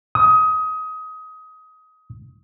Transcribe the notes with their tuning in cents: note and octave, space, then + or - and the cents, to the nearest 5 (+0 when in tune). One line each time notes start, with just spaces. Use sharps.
D#6 +20